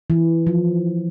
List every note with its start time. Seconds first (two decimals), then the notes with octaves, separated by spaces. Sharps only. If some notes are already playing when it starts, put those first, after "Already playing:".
0.10 E3
0.47 F3